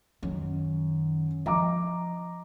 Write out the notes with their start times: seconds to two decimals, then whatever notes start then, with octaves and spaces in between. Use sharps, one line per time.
0.23 F#2 D#3
1.46 F3 D#5 A#5 D6